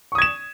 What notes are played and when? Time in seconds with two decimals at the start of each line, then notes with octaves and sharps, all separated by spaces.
0.12 C#6
0.15 D#6
0.18 G#6
0.22 E7